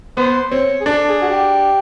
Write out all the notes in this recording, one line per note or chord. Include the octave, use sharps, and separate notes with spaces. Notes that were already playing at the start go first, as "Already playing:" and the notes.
B3 C5
C4 C#5
G#4
D4 A4
G#4
F#4
G4